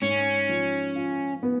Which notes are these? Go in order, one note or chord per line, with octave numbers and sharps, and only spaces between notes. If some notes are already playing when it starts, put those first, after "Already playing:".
G#2 C#4
F3
F4
B3